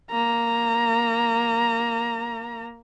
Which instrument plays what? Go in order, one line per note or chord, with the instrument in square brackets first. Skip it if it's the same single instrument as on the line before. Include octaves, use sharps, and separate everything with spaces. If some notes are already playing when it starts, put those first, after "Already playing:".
[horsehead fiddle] A#3 A#5